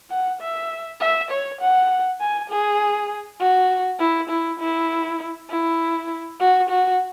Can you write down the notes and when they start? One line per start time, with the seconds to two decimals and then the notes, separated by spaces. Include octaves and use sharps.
0.11 F#5
0.41 E5
1.01 E5
1.31 C#5
1.61 F#5
2.21 G#5
2.50 G#4
3.41 F#4
4.00 E4
4.30 E4
4.60 E4
5.50 E4
6.40 F#4
6.70 F#4